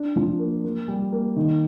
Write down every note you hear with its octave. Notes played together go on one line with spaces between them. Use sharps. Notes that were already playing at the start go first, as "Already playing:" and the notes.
Already playing: D4
F3
A#3
A#3
G3
A#3
D#3